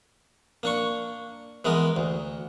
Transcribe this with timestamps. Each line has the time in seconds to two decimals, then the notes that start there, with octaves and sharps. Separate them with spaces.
0.63 A#3 D4 C#6
1.65 E3 G#3 B3 A#4
1.96 D2